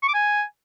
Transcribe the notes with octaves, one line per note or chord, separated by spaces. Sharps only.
C#6
D6
G#5